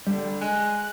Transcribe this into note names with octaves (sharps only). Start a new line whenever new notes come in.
D3 G3
G#3 F#6